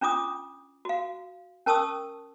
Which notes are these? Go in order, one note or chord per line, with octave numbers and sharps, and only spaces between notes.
C#4 D4 F4 D6 D#6
F#4 F5
C#4 A#4 A5 C#6 D#6 E6